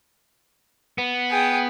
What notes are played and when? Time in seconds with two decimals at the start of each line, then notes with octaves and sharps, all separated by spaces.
0.98 B3
1.30 G#4 G5